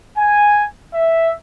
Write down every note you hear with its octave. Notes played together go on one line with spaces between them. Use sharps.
G#5
E5